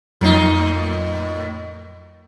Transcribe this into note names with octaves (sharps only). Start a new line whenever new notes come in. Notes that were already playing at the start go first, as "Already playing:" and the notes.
F2 A2 F#3 D#4 C7